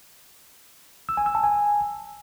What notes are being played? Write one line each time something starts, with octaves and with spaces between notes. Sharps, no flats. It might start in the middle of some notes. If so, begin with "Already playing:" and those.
E6
G#5
E6
A5
G#5